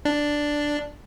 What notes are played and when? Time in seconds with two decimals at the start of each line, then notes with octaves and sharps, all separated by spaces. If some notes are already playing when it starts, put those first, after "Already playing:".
0.05 D4